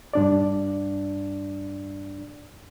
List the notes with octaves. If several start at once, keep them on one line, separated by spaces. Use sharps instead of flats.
G2 D4 D5